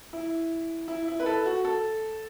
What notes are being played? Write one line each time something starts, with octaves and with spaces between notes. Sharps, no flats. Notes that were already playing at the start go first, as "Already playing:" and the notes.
E4
E4
E4
B4
A4
F#4
A4